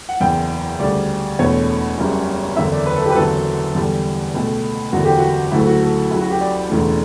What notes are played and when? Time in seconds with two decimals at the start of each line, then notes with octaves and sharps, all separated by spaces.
0.09 F#5
0.20 F#1 E2 C#3 G5
0.79 D2 C#3 G3 D5
1.39 E1 E2 B2 A3 C#5
1.98 F#1 F#2 C#3 G3
2.56 F#1 E2 D3 E5
2.71 D5
2.86 B4
2.96 A4
3.06 G4
3.11 B4
3.15 F#1 E2 D3 F#3 A4
3.75 E2 D3 G3
4.34 C#2 B2 A3
4.92 F#1 E2 D3 F#4
5.05 G4
5.18 F#4
5.51 D2 C#3 F#3 A3 E4
5.67 F#4
5.81 A4
6.10 C#2 C#3 F#3 E4
6.20 F#4
6.30 G4
6.41 D5
6.70 E1 E2 C#3 E3 A3